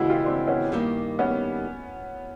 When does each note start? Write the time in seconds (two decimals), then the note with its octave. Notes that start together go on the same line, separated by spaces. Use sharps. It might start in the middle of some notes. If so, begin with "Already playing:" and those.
Already playing: D#2 C#3 E3 G#3 E4 F#4
0.09 F4 G4
0.24 C4 D4
0.48 B3 C#4
0.72 G2 D#3 G3 A#3
1.19 B3 C#4